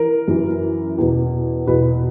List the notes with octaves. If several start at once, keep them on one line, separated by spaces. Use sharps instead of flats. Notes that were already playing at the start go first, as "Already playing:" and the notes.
Already playing: E3 A#4
F#2 E3
E2 B2
E2 B2 B4